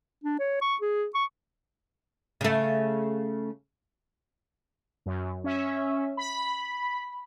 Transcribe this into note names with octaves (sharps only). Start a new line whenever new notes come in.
D4
C#5
C#6
G#4
C#6
C#3 A3
F#2
C#4 E5
B5